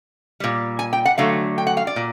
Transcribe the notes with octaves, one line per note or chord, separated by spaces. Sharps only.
A#2 G3
G#5
G5
F#5
D3 F#3 A3 F5
G5
F#5
F5
D5
A#2